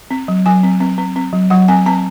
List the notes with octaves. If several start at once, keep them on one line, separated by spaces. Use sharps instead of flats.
C4
F#3
F#3 G#5
C4
C4
C4
C4
F#3
F#3 F#5
C4 G#5
C4 A5